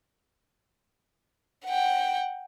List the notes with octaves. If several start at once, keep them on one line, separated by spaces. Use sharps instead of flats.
F#5 G5